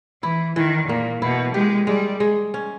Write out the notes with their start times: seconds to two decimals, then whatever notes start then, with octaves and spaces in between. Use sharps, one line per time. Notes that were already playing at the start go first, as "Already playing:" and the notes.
0.22 E3 E4
0.56 D#3 E3
0.88 A#2 A#3
1.22 B2 E4
1.54 G#3 G4
1.87 G3 G#3
2.20 G#3
2.54 C#4